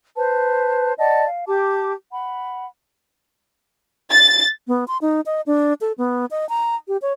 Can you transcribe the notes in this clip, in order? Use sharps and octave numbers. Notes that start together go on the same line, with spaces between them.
B4 C5 A5
D5 D#5 F#5 A5
F5
G4 A5 D6
F#5 B5
A6
B3
C6
D#4
D#5
D4
A4
B3
D#5
A#5
G4
C#5